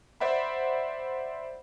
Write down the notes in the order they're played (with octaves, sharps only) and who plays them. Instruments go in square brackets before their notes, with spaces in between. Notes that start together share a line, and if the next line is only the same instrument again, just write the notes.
[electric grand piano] C5 D5 E5 F#5 B5